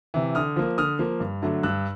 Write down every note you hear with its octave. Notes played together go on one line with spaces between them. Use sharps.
C3 E3
D3 D#6 F6
F3 A#3
D3 D#6 F6
F3 A#3
G2
D3 F#3 A3 D4
G2 E6 F#6